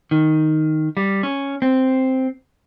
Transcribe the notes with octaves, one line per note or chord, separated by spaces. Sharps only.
D#3
G3
C#4
C4